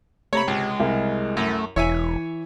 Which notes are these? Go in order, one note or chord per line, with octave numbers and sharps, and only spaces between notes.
C3 A3 C#5 A#5 B5
C#2 G#3
C2 A#4
F#2 A3
E1 E3 C#5 E5 G#5